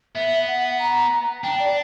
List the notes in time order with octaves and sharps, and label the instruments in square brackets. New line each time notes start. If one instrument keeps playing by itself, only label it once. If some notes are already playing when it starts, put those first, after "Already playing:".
[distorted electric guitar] B3 [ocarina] E5
[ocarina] F#5
A#5
[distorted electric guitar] D4 [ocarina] G5
[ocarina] D5